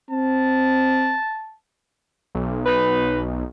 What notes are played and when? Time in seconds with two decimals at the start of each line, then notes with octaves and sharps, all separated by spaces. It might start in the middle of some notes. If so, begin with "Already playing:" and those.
0.11 C4 A5
2.35 B1
2.66 D#4 B4